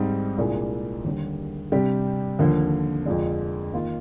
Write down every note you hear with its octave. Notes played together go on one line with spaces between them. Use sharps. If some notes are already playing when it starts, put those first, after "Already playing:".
Already playing: G#2 G3 C4 D#4
C2 A#2 G#3 D4 G#4
D#2 D3 G3
C3 G3 D4 G4
D#2 D3 F3 A#3
F2 D3 F3 G#3 D4
D#3 A#3 F4